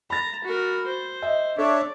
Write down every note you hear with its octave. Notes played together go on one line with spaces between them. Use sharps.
A#5 B5 A6
F#4 A#4
C5
D#5 E5
D4 A4 C#5 D5 E5